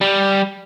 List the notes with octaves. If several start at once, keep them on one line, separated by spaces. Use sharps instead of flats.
G3